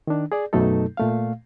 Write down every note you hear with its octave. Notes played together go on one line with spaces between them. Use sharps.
D#3 D4
G#4 D5
F#2 B2 F#3 A3 D#4 A4
A#2 A3 F5